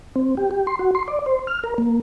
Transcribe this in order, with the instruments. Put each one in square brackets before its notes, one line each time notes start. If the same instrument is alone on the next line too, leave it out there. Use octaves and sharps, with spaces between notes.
[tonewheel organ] C4
G4
G4
C6
F#4
C6
D5
C5
F6
A#4
A#3